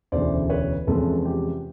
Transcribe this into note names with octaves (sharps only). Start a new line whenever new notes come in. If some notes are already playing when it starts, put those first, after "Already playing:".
E1 D2 C#3 E3 C5 D5
B4 C#5
E2 C3 F3 G#3 C#4 A4 B4
G4